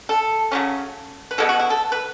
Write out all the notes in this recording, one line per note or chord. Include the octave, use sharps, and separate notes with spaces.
A4
C#3 F#3 A3 C#4
B4
B2 G#3 B3 A4
F#4
E4
A4
B4